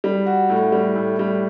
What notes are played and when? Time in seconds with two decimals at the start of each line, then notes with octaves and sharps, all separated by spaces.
0.04 G3
0.26 F#4
0.49 A2
0.72 G3
0.96 A2
1.19 G3